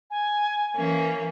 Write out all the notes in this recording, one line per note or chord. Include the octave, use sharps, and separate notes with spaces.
G#5
E3 A#3 C#4